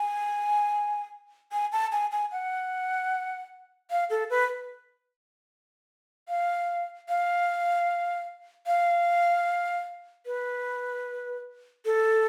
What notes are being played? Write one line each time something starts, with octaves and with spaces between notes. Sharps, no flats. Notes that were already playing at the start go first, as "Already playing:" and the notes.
Already playing: G#5
G#5
A5
G#5
G#5
F#5
F5
A4
B4
F5
F5
F5
B4
A4